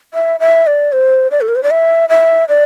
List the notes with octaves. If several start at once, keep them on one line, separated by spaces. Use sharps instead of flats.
E5
E5
D5
C5
D5
A4
A#4
C5
D5
E5
E5
D5